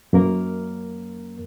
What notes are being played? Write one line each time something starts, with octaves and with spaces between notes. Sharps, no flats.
F#2 A#3 A#4